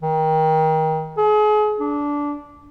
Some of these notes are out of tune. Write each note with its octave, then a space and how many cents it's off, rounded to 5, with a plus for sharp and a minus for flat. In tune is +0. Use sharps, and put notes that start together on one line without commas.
D#3 +25
G#4 +35
D4 -15